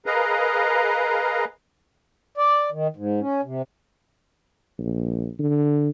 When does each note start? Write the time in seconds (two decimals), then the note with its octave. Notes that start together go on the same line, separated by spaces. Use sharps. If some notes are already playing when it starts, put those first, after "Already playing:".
0.06 G#4 A#4 B4 D#5 F5 A#5
2.38 D5
2.72 D#3
2.96 G#2
3.20 C#4
3.44 C3
4.79 A#1
5.40 D3